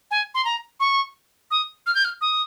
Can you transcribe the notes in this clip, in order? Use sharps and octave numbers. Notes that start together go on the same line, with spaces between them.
G#5
C6
A#5
C#6
D#6
F6
G6
F6
D#6